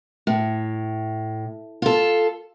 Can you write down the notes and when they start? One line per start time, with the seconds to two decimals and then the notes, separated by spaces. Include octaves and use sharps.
0.27 A2
1.82 F4 A4